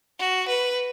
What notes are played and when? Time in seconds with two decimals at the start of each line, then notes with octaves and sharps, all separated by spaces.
0.19 F#4
0.48 B4